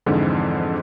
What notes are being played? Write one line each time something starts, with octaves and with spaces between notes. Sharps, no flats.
F2 G#2 D3 E3